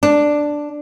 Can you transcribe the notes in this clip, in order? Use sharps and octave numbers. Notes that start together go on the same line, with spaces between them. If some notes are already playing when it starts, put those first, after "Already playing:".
D4